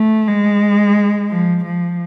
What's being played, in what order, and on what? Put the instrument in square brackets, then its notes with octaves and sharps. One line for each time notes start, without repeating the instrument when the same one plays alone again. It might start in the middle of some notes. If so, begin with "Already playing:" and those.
Already playing: [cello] A3
G#3
F3
F3